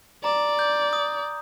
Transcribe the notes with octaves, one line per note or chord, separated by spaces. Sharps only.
D5 A#5
G6
D#6